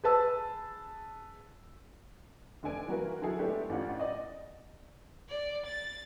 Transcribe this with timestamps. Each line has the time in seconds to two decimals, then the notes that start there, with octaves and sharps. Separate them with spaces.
0.04 G#4 B4 A5 E6
2.63 F1 D3 D4 G#5 D7
2.88 E3 G3 A#3 F#4 A#4 B4
3.22 D3 F#3 E4 G#4 A4
3.39 G#3 A3 B3 D4 E4 G4
3.69 A1 C#4 D4 F4 G4 F#5
3.99 D5 D#5
5.29 D5
5.66 A6